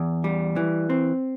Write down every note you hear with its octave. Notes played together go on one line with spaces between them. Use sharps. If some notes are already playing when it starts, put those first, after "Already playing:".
Already playing: E2
G3
E3
C4